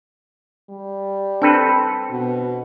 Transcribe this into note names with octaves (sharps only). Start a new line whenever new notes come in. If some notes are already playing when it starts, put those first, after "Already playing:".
G3
C4 D4 A4 B4
B2